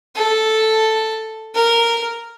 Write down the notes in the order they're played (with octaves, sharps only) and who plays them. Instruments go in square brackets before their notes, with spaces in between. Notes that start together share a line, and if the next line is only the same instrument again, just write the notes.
[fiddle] A4
A#4